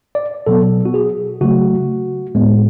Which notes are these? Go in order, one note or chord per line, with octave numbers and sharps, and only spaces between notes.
D5
B2 F#3 B3 A4
F#4
G#4
C#3 F#3 A3 F#4
A2 G#3 B3